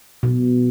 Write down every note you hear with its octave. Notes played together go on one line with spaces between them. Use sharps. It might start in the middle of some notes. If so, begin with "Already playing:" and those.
B2